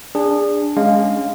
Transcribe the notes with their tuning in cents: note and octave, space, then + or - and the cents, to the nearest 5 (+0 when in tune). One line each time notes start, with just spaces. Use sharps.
D4 +0 G#4 -25
G#3 +0 C#4 +10 F5 +0